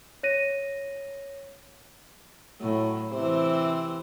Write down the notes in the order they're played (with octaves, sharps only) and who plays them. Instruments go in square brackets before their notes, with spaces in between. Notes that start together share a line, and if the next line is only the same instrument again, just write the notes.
[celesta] C#5 A#6 D#7
[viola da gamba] A2 [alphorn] F#3
[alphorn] C3 [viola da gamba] E3 C4 C5